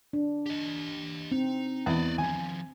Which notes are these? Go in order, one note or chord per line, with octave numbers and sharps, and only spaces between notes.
D4
G4 D#5
C4 D#4
E2 D5 D#5
D#3 F3 G#5